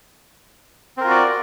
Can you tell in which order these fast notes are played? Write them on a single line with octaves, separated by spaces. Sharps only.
C4 A#4 F4 F#4 D5